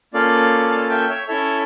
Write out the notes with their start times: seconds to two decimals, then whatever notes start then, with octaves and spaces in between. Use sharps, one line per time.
0.14 A#3 C#4 F4 A4 D5 F5
0.71 F5 A5
0.90 E5 G5
1.09 C#5 E5
1.28 C#4 E4 A4 C#5 E5